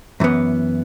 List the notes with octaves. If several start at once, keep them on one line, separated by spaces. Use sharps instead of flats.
F#2 E3 B3